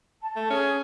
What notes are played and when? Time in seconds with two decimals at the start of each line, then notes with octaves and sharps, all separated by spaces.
0.20 A5
0.36 A3
0.50 C#4 G#4